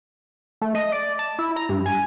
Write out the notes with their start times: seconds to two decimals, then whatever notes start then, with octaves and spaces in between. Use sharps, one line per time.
0.61 A3
0.75 D#5
0.92 D5
1.19 A5
1.39 E4
1.56 A#5
1.69 G2
1.86 G#5